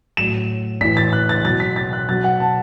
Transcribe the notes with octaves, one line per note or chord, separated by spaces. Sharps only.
A2 F#3 E7
A2 E3 B6
A6
F#6
A6
B2 F#3 A6
B6
A6
F#6
B2 F#3 A6
F#5
A5